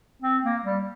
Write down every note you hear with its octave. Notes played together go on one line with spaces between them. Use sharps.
C4
A#3
G3